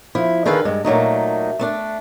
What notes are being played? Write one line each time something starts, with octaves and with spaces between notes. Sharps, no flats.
F3 E4
D3 D#3 G#4 A4 B4 F5
G2 G#3
A#2 F#3 A3 D#4
A3 B3 D4